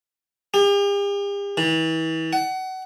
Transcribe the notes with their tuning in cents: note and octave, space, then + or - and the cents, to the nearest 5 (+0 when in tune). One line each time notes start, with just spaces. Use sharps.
G4 +45
E3 -35
F#5 +25